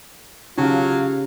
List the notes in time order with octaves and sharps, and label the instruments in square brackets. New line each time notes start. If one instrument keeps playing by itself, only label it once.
[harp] C#3 G4 [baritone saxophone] F#3 [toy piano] C#4 D#4 [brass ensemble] F4 F5